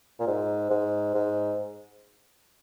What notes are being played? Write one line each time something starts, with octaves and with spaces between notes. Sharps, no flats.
A#2
G#2
G#2
G#2